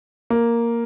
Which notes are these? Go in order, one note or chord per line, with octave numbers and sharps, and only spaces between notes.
A#3